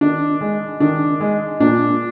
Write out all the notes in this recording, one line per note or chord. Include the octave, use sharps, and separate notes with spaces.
D#3 D4
G#3
D#3 D4
G#3
A#2 D4